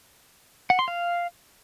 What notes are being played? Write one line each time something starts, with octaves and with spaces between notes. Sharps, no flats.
F#5
C6
F5